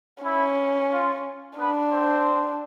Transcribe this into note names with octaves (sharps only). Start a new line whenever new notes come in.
C#4 E4
F4
B3 D4 B4
C4 C5